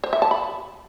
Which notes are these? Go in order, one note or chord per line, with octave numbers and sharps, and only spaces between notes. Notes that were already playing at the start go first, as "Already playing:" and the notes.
C5
E5
A5
B5